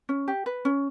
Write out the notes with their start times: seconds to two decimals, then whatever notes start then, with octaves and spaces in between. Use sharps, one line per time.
0.09 C#4
0.28 G4
0.46 B4
0.65 C#4